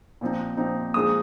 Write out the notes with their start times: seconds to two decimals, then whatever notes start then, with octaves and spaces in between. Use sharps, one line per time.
0.21 A#2 F3 C4 D#4
0.57 A#2 F3 C4 D#4
0.94 A#2 F3 G#3 D#4 D#6